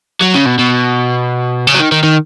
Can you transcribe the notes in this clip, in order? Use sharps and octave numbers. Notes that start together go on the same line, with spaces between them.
F#3
C#3
B2
B2
C#3
F#3
D#3
D#3
D#3